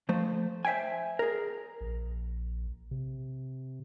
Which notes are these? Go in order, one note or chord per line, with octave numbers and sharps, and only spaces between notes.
F3 A3 C5
C5 E5 F5 G5 G#5
G#4 A#4
A#1
C3